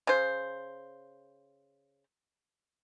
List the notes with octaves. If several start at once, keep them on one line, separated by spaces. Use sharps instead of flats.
C#3 C5